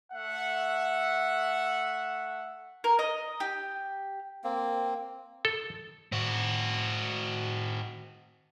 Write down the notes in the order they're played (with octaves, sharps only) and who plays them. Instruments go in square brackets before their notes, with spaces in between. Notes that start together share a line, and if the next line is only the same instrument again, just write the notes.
[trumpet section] A3 E5 F#5
[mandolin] A#4
D#5
G4
[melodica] A#3 C4
[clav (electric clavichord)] A4
[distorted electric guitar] C4 F#4